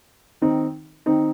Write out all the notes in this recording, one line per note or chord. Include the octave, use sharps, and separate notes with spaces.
D#3 C4 D#4
D#3 C4 D#4